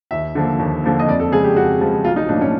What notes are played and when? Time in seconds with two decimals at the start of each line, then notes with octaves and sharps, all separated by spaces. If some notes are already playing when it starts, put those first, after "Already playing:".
0.11 D#2 E5
0.35 D3 F3 A#3
0.59 D#2
0.83 D3 F3 A#3
0.99 D#5
1.08 F2 D5
1.20 A4
1.32 C#3 F3 G#3 G#4
1.44 G4
1.56 F2 F#4
1.81 C#3 F3 G#3
2.04 B1 F4
2.16 D#4
2.29 A2 F3 A#3 D4
2.41 C#4